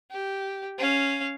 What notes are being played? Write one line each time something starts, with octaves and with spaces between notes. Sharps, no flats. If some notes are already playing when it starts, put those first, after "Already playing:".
G4
C#4 F5